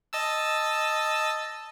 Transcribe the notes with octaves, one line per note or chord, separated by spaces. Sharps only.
D#5 A5 E6